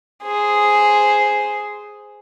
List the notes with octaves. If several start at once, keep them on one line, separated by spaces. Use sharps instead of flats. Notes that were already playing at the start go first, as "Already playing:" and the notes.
G#4 C5